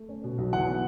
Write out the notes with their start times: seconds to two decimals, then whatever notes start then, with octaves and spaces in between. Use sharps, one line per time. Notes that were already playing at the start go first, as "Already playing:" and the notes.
Already playing: A3
0.09 C#4
0.24 B2
0.38 B1
0.52 E3 F#5
0.68 B3